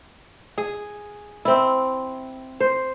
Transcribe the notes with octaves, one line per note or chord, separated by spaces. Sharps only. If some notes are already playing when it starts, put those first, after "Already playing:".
G#4
C4 E4
C5